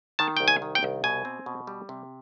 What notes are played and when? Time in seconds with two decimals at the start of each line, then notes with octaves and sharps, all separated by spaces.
0.19 D#3 A5
0.37 C2 G5
0.48 G#5
0.62 D#3
0.75 G5
0.83 C2
1.04 B2 G#5
1.25 C4
1.46 B2
1.67 G3
1.89 C3